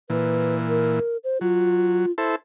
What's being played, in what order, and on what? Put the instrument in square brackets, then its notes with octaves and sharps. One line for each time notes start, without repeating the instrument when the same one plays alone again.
[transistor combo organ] A#2 E3 [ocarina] B4
[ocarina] A#4
C5
[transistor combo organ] F#3 [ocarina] F4
[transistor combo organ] E4 A4 C5